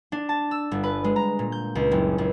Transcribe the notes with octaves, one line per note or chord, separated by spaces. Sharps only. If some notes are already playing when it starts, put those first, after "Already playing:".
D4
A5
E6
G1
B4
G#3
A#5
A#2
G6
C#2
F#1
C#2